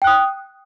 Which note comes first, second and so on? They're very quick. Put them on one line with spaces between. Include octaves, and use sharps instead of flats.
G5 F#6 D#6